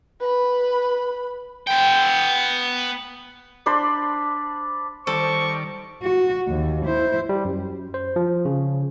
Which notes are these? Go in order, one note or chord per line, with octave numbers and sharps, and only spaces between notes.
B4 B5
B3 G5
D4 C5 D5 B5
D#3 G3 A4 C5 D5 C#6
F#4
D#2
E4 C5
G3
F#2
C5
F3
C#3